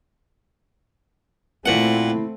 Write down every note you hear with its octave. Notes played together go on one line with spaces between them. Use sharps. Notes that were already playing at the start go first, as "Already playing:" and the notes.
A#2 A3 C4 E4 F#5